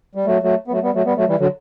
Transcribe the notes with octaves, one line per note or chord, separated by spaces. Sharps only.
G3
F#3 A3
F#3 A3
B3
F#3 A3
G3 B3
F#3 A3
G3 B3
F#3 A3
E3 G3
D3 F#3